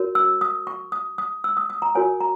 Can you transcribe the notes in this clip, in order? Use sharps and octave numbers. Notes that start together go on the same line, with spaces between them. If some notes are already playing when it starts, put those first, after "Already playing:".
Already playing: F#4 A#4 C#5
E6
D#6
C#6
D#6
D#6
E6
D#6
D#6
A#5
F#4 A#4 C#5 G#5
A#5